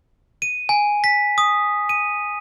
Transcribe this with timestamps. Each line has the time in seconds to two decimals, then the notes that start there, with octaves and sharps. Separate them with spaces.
0.42 D#7
0.69 G#5
1.04 B6
1.38 D#6
1.89 D#7